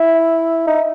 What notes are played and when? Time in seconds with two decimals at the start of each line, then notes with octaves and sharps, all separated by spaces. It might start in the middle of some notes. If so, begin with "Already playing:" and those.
Already playing: E4
0.67 D#4